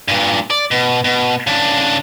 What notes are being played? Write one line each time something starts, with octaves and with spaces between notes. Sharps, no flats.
G2 A#2
D5
B2
B2
C#3 D4